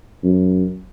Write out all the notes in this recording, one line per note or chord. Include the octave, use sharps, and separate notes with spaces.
F#2